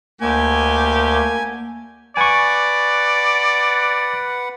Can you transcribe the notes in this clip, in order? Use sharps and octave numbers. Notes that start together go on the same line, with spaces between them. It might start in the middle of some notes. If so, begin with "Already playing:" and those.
D2 A#3 G4 G#5
B4 D5 F#5 G#5 C#6